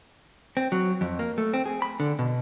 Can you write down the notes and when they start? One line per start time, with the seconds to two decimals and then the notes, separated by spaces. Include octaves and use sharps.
0.57 C4
0.72 F#3
1.01 F2
1.19 A#3
1.38 A3
1.54 C4
1.65 G#4
1.82 B5
2.00 D3
2.19 B2